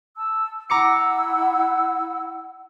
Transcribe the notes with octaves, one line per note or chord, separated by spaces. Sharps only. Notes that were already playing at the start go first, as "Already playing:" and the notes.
A5 E6
E4 F#5 A#5 D6 E6 C#7